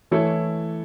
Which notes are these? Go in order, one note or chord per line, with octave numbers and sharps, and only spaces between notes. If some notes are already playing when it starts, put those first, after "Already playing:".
E3 A3 E4 A4 C#5